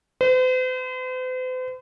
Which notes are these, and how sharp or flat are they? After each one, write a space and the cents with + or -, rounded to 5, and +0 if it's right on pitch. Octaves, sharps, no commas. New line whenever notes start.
C5 -45